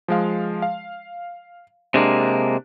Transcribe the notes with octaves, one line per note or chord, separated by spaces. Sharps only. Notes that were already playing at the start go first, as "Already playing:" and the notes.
F3 G#3 F5
F5
C3 G#3 A#3 D4 G4